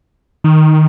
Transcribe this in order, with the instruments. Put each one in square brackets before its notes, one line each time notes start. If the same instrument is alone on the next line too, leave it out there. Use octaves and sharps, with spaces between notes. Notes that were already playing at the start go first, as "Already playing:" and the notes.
[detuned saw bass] D#3